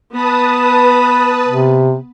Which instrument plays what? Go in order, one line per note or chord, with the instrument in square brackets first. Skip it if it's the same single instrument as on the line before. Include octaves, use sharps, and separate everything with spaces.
[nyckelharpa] B3 B5 [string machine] B4 A5 D#6
[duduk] C3